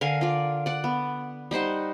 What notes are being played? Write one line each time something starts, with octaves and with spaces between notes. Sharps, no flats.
D3 A#4 F5 G#5
F4 D5
D5 F#5
B3
G3 D#4 C5 F#5